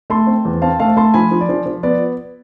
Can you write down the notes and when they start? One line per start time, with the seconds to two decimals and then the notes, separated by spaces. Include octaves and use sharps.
0.10 A3 A5 C6
0.27 C4
0.45 E2
0.62 C4 F5 A5
0.79 A3 F5 A5
0.97 A3 A5 C6
1.14 F3 G#5 B5
1.32 F3
1.41 D5
1.49 F3
1.66 F3
1.83 B3 D5